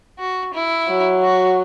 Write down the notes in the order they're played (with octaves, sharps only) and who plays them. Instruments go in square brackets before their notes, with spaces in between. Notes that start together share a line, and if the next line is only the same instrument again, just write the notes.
[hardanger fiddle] F#4
E4
[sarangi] F#3
[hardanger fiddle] F#4